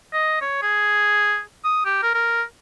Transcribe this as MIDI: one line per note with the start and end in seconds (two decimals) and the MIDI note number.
0.13 0.36 75
0.41 0.60 73
0.62 1.40 68
1.64 1.81 87
1.85 1.99 67
2.02 2.11 70
2.14 2.42 70